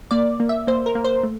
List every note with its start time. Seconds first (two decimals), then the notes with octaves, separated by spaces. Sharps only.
0.11 A#3 D5
0.40 A#3
0.49 E5
0.67 A#3 C5
0.86 A#4
0.95 A#3
1.04 C5
1.23 A3